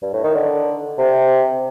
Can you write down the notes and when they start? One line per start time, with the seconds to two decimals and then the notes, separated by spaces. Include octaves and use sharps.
0.02 G2
0.13 A2
0.24 D#3
0.35 D3
0.98 C3